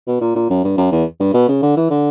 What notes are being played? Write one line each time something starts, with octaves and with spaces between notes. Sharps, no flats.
B2
A#2
A#2
F#2
G2
F#2
E2
G2
B2
C#3
D3
E3
D3